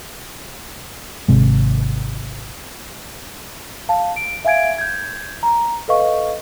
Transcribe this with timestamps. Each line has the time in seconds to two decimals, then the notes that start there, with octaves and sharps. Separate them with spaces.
1.28 G#1 C3 G#3
3.89 F5 A5
4.16 D7
4.45 E5 F5 G#5 G#6 D7
4.78 G6 G#6
5.43 A#5
5.88 A4 B4 D#5 F5 C#6